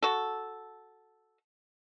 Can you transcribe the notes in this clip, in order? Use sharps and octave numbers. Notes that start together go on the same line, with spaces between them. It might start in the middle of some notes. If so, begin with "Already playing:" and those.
F#4 A4